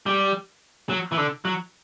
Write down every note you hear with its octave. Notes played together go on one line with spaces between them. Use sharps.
G3
F#3
E3
D3
F#3